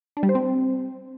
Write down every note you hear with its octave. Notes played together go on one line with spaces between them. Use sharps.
D4
G3
C5
C4